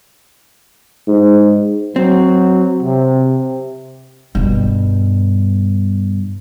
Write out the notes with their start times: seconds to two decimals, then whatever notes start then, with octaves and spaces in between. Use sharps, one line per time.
1.07 G#2
1.96 F#3 C4
2.83 C3
4.35 G2 B2